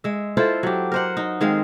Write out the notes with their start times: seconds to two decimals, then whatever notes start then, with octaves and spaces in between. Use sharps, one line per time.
0.04 G#3 E5
0.37 E4 F4 A4 C5
0.63 F#3 G4
0.92 A#4 C5 F#5
1.17 D#4
1.41 D#3 G#3 C4 F5